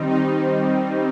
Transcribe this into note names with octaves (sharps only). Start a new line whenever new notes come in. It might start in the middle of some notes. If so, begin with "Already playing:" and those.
Already playing: D#3 G3 C4 D#4
D#4